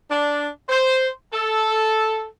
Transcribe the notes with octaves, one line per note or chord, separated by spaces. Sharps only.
D4
C5
A4